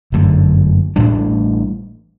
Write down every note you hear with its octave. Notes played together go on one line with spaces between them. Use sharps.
G1 F#2 D3 A3
A1 A2 G3 D4